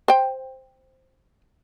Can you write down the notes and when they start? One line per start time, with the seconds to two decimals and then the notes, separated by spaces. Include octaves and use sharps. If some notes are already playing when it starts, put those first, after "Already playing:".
0.08 C5 G5